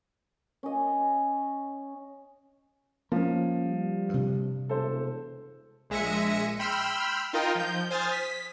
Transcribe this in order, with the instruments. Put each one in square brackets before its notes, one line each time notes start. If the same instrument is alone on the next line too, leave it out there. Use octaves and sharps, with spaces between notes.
[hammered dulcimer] C#4 D#5
[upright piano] F3 [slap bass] A#3 C#4
[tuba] G3
[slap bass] G2 C3
[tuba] E1 [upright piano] A4 C5
[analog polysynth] A#1 G#3 E5 A#6 C#7 D#7
G5 B5 C6 E6 F6
D#4 F4 A#4 D#5 F5 G5
F3 G6
C5 G#5 D#6 F6 A6
B6